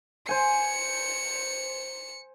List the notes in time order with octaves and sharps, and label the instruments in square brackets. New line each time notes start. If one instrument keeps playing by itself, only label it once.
[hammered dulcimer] C5 G#5 [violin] C#7